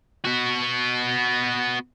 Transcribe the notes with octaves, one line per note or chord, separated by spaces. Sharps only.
B3 F#4